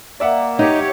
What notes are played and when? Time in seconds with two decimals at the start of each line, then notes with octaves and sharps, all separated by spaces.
0.20 A#3 D5 E5 F#5
0.59 D#4 G4 C#5